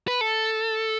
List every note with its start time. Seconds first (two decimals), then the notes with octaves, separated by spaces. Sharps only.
0.08 B4
0.21 A4